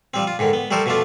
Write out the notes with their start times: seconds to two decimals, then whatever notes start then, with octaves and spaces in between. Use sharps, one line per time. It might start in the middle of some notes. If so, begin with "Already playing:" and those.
0.14 F3 G3 C4
0.27 F4
0.39 G#2 D3 D#3
0.53 B3
0.71 G3 A3 A4 A#4 C5
0.86 B2 F3 A3 D4 F4